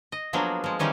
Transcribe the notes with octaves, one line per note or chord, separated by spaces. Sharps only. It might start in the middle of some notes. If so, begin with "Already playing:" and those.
D#5
F3 F#3 A#3 B3 D4 G#4
F3 G#3
D#3 E3 G3 C#4 D#4